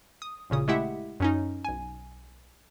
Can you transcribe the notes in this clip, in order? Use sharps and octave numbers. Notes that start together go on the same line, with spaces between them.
D#6
A1 A#2 C#3 D#6
G#3 A3 E4 G4 E5 F#5
F#2 C#4 D#4
B1 G#5